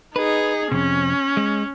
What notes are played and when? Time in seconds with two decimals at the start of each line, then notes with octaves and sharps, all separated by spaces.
0.16 D#4 G#4 B4
0.71 F2 C3 C#4
1.37 G#3